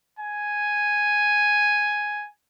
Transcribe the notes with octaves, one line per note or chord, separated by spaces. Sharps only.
G#5